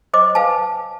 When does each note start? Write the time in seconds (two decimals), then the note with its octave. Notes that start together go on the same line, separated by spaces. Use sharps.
0.13 C5 D#5 D6
0.35 B4 F5 G#5 A5